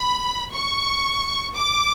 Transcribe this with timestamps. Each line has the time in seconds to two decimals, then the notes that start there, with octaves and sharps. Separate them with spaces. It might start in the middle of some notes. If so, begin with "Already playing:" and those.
Already playing: B5
0.54 C#6
1.57 D6